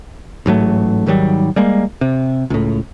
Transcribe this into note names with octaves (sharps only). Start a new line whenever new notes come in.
A1 G#2 F#3 A3
G#2 D#3 F#3 G3
G3 G#3 A#3
C3
C#2 A2